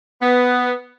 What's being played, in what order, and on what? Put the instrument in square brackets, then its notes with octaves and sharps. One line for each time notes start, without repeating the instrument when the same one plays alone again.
[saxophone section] B3